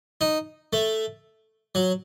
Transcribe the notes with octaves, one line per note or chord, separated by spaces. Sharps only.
D#4
A3
F#3